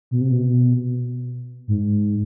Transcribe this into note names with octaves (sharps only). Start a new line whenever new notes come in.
B2
C3
B2
G#2